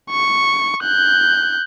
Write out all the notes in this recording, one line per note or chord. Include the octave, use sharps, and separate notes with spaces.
C#6
F#6 G6